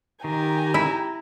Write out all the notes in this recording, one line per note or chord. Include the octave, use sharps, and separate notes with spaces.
D#3 G4 G#5 A#5
E4